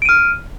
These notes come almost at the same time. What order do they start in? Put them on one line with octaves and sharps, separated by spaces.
D7 D#7 F6